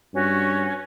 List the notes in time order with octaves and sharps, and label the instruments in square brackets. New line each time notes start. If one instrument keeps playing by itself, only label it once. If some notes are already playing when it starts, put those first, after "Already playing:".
[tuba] G2 [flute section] C#4 F#4